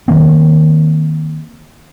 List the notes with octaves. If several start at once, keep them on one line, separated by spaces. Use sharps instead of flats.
D#3 A#3 C4